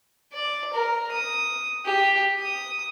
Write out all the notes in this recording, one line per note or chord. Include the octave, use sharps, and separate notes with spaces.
D5
A#4
D#6
G4
D#6